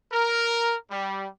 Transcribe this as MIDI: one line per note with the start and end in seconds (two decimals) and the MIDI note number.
0.12 0.75 70
0.91 1.27 55